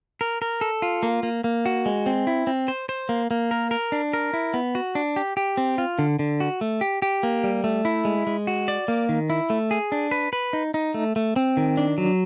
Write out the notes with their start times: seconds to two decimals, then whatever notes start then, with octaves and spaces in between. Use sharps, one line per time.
0.21 A#4
0.42 A#4
0.61 A4
0.82 F4
1.03 A#3
1.23 A#3
1.44 A#3
1.66 F#4
1.86 G#3
2.06 C4
2.27 E4
2.47 C4
2.68 C5
2.89 C5
3.09 A#3
3.31 A#3
3.51 A#4
3.71 A#4
3.92 D4
4.13 A#4
4.33 E4
4.54 B3
4.75 F#4
4.95 D4
5.16 G4
5.37 G4
5.57 C4
5.78 F4
5.99 D3
6.19 D3
6.40 F#4
6.61 A3
6.81 G4
7.02 G4
7.23 A#3
7.44 G3
7.64 A3
7.85 E4
8.05 G#3
8.27 G#3
8.47 F#4
8.68 D5
8.88 A#3
9.09 D#3
9.30 E4
9.50 A3
9.71 G#4
9.92 D4
10.11 B4
10.33 B4
10.53 D#4
10.74 D#4
10.94 A3
11.16 A3
11.36 C4
11.57 D#3
11.77 D4
11.98 F#3